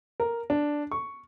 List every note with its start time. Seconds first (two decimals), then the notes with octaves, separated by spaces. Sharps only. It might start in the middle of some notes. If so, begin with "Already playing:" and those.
0.20 A#4
0.50 D4
0.91 C#6